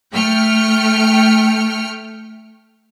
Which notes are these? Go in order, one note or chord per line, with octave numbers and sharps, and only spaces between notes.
A3 G5 F6 C#7